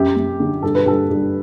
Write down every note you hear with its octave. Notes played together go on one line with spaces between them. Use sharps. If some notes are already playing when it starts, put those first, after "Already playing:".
Already playing: F#2 G4
F#2
D3
G2 A4
B4
G2 A4
G2